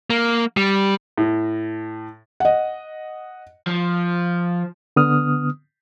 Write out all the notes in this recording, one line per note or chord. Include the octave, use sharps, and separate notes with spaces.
A#3
G3
A2
D#5 F#5
F3
D3 B3 D#6 F6